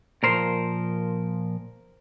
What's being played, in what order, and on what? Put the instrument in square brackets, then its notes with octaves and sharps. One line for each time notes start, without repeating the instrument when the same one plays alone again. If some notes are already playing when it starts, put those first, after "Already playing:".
[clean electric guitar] A#2 F3 A#4 C5